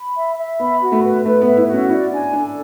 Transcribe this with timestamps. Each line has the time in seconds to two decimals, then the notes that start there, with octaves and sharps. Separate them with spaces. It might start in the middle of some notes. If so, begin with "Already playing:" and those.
Already playing: B5
0.16 E5
0.38 E5
0.59 B3 B5
0.81 F#4
0.92 A3
1.03 B4
1.25 A3 B4
1.41 B3 E5
1.57 E4
1.68 F#4
1.74 C#4
1.89 E4 D5
2.11 D4 G#5
2.33 D4 A4